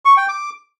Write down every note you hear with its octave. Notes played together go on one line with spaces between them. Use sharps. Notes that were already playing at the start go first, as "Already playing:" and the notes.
C#6
G5
D6